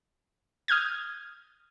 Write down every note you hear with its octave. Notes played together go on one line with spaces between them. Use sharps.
D#6 F6 G6 G#6